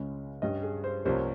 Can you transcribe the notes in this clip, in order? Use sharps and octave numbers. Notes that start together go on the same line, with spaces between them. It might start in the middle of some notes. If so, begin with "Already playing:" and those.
Already playing: C#2 C#3 G#3 C#4
G2 G3 C#4 D#5
G#4
C5
C2 C3 F3 A#3 C#4 C5